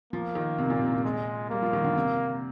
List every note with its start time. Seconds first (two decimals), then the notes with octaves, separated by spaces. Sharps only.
0.13 F3 A#3
0.35 D#3
0.58 C3
0.70 A#2
0.81 C3
0.93 A#2
1.04 G#3
1.50 G3 A#3
1.62 F3
1.73 D#3
1.84 D3
1.95 C3